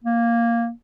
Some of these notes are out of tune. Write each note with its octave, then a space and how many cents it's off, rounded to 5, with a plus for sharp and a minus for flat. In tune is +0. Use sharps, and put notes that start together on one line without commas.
A#3 +0